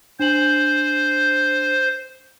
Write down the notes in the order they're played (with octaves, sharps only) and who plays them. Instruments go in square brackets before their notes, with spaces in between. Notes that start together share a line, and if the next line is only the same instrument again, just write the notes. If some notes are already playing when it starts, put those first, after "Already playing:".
[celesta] D4 G#5 F#7 [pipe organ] C5